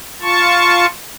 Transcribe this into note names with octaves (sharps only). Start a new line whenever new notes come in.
F4 A5 C#6